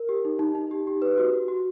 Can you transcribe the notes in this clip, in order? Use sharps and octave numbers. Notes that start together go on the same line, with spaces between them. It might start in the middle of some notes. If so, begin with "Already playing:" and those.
Already playing: A#4
G4
D#4
D#4
D#4
G4
G4
B4
F#4
F#4
F#4